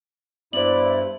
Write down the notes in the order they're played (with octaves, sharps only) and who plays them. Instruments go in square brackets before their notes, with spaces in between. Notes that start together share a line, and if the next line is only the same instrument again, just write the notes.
[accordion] G2 E4 [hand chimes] B3 C5 [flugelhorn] D5 [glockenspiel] F#7